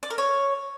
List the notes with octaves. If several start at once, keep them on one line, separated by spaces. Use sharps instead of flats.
D5
A#4
C#5